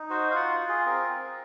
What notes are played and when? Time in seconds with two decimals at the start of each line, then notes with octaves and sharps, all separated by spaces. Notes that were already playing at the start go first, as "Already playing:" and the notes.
Already playing: D#4
0.10 F#4 C5
0.31 F5
0.35 F4 F#5
0.60 F4
0.69 G#4
0.86 C4 A#4
1.11 C4